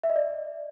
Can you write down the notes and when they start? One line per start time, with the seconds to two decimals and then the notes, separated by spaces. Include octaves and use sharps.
0.04 E5
0.10 D#5
0.16 D5